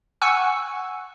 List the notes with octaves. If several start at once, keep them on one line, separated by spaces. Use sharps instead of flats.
F#5 G#5 C#6 E6 F#6